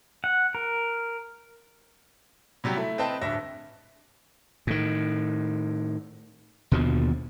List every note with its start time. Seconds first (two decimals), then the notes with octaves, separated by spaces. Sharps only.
0.24 F#5
0.55 A#4
2.64 C3 F#3 G3 G4
2.76 A3 E4
2.98 C4 B4 D#5 G5 A5
3.22 D1 G2 E5 A#6
4.67 A2 D#3
6.71 D#2 B2 D3 F3